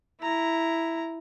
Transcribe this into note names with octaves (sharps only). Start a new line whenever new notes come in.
E4 A#5